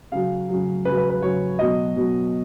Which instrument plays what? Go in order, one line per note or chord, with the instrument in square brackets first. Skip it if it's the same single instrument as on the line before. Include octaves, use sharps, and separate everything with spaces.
[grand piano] C#3 F#3 F5
C#3 F#3
C#3 F#3 B4
B4
B4
C#3 F#3 C#5
B2 F#3 D#5
B2 F#3